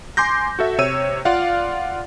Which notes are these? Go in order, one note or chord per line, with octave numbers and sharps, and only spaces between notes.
G#5 C6 D6 G6 A#6
F#4 A4 E5
C3 C#5 E6 D#7
F4 D5 F5 F#5